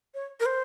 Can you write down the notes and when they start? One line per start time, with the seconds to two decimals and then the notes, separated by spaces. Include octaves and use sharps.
0.14 C#5
0.40 A#4
0.46 C5